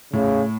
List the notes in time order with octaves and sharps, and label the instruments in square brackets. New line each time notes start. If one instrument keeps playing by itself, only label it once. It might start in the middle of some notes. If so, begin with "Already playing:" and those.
[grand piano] A2 [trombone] C#3